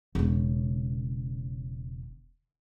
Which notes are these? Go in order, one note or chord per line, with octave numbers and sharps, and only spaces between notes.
E1 C#3